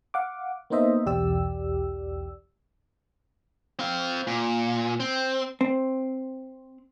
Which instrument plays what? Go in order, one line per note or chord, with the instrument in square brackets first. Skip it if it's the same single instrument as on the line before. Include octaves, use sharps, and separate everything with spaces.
[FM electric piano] F5 F#5 D6
A#3 B3 D#4 C5 D#5 E5
B1 E2 G4 D5 E6
[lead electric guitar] C4 F5
A#2
C4
[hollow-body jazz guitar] C4